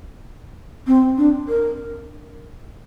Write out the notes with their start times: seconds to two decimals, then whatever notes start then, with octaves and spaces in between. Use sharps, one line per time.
0.87 C4
1.18 D4
1.48 A#4